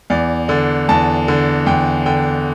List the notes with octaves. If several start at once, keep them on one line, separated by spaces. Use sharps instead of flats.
E2 D5
D3 D5
E2 A5
D3
E2 G5
D3 G5